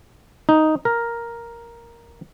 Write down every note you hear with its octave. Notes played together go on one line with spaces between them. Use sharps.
D#4
A#4